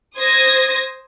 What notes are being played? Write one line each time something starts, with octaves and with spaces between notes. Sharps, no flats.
C5 D#6 G#6 A#6